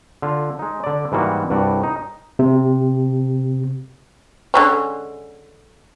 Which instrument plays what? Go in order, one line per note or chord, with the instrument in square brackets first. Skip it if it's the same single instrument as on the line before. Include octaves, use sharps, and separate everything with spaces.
[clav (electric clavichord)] D3 F4
G#3 D#4
D3 D5
G#2 E3 G3 A#3 F#4
C2 G2 F#4 D5
D#4
[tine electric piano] C3
[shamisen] D3 G#3 C#4